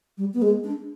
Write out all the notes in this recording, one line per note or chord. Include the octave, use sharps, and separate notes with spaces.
G3
B3
G#3
D4